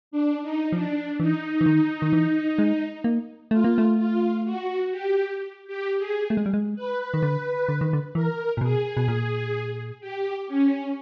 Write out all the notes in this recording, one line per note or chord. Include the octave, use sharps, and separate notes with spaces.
D4
D#4
F3 D4
E3 D#4
E3
D#3
D#3
E3
G#3
A#3
A3 F4
A#3
A3
F4
F#4
G4
G4
G#4
A3
G#3
G3
G#3
B4
D#3
D3
D3
D#3
D3
E3 A#4
A#2
B2 G#4
B2
A#2
G4
C#4